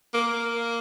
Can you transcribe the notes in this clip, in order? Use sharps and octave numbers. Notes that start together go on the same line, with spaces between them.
A#3